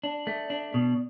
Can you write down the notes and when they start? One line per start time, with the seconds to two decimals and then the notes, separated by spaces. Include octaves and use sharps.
0.04 D4
0.27 A3
0.50 D4
0.74 B2